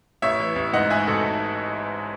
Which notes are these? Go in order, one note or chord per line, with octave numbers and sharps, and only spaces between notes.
A1 C#5 E5
E3
A1
G#2 D#5 F#5
G#3 E5 G#5
G#2 F#4 A4